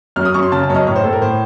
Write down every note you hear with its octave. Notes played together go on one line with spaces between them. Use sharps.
F#2 F6
D#6
F#2 C#6
C6
C#3 A5
A5
F#2 C#5
D#5
A2 C#5
C5
A2 A4
A#4
A2 C5